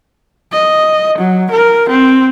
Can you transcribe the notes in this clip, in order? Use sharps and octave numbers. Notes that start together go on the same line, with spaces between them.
D#5
F#3
A#4
C4